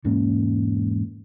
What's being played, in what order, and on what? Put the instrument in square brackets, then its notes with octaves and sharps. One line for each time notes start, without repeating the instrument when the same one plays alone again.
[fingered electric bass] E1 G#2 A#3 C#4